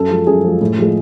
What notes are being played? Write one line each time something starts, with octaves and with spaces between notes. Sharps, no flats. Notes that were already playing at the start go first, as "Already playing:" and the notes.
Already playing: F#2 A4
F3 G#3
F#2 G#4
F3 G#3
A2
F3 G#3